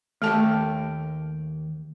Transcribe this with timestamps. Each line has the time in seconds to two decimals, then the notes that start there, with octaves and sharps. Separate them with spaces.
0.22 D#2 A3 G4 A4 A5